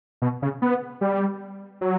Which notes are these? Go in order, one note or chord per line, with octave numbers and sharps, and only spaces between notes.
B2
C#3
B3
G3
F#3